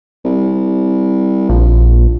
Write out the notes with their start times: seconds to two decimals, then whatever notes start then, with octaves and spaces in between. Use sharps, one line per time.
0.25 C2
1.49 A#1 F3